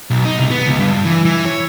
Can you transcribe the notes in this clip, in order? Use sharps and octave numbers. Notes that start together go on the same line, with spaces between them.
B1
D#4
C2
B3
C#2
G2
E3
E3
C#5